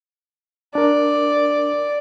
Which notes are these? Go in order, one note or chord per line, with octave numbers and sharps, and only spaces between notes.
D4 A#4 D5